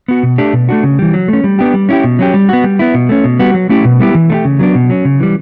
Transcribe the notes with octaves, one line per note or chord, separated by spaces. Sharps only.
B3 F#4
B2
A3 D4 G4
B2
A3 D4 F#4
C#3
E3 G3
F#3
A3 C#4
G3
B3 D4 G4
G3
C#4 E4 G4
B2
F#3 C#4 G4
G3
B3 F#4
G3
B3 E4
B2
A3 C#4
B2
G3 B3 F#4
F#3
A3 C#4 E4 G4
B2
G3 B3 E4 G4
E3
A3 D4 G4
C#3
F#3 B3 D4
B2
F#3 C#4
C#3
E3 G3